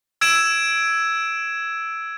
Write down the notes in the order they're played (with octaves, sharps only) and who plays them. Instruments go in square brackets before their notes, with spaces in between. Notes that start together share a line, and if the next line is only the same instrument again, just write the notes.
[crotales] E6 G#6 D7 E7